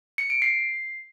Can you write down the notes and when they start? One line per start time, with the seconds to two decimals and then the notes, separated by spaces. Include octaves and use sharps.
0.18 C#7
0.30 D7
0.42 C7